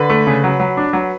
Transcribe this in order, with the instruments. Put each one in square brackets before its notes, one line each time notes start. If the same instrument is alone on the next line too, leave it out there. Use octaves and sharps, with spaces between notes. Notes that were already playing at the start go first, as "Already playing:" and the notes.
Already playing: [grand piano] D3 B4
A3
C#3
F#3
F#3
D4
F#3